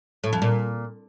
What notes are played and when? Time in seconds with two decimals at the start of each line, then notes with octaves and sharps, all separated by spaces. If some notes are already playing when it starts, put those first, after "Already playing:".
0.24 A2
0.33 F2
0.42 A#2